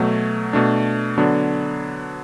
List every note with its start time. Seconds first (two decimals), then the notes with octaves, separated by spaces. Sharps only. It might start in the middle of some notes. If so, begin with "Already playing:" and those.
Already playing: B2 F#3 A3
0.53 B2 A3 D4
1.18 D3 F#3 B3 D4